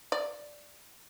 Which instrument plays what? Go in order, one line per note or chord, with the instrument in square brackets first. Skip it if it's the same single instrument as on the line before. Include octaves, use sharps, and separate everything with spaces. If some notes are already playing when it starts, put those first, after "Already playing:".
[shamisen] D5